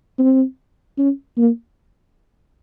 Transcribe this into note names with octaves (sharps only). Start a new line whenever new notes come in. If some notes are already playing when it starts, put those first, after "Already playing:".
C4
C#4
A#3